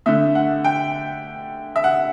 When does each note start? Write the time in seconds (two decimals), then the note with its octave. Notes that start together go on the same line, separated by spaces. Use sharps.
0.06 D3 A3 E5
0.35 F#5
0.64 G5
1.76 E5
1.84 F#5